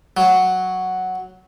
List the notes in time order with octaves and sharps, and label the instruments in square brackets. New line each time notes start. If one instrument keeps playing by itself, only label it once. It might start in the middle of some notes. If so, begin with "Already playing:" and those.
[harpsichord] F#3